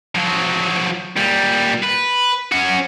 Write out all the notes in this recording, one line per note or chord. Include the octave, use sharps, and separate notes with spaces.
F3 F#3
A#2 G3
B4
C#4 F#4